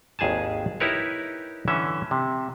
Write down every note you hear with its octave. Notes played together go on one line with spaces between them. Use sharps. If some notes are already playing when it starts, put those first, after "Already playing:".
G#1 D#2 G#4 G#5 A5
D#4 E4 G4 A#4 B4 C#5
D3 E3 C#4 E5
C3